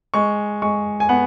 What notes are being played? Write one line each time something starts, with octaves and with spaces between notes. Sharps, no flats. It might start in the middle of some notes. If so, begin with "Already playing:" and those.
G#3 C#6
G#3 C#6
G#5
B3 F#5